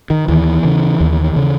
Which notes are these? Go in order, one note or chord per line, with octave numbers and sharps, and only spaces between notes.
D#3
D#2 E3
C#3
D#2
C#3